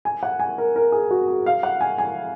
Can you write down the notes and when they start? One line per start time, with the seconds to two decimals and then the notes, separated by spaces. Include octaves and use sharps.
0.05 G#5
0.23 F#5
0.40 G#5
0.58 A#4
0.76 A#4
0.92 G#4
1.11 F#4
1.28 G#4
1.46 F5
1.63 F#5
1.81 G#5
1.98 G#5